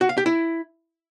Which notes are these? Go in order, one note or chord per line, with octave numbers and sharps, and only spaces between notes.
F#4
F5
G4
E4